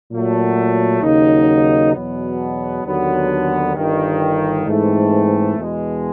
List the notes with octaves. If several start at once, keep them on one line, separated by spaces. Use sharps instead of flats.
A#2 F#3 A3
D#2 C#3 F#3 A#3 D#4
E2 B2 F#3 B3
D#2 D3 F#3 B3
G1 G2 D#3
G#2 E3 A3 C4
E2 B2 G#3